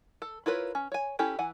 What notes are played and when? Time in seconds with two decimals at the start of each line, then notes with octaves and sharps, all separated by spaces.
0.22 A4
0.46 E4 F4 A#4 B4 C#5
0.75 C#4
0.92 C#5 G#5
1.19 C#4 E4 G4 A4
1.39 E3 F#5 G#5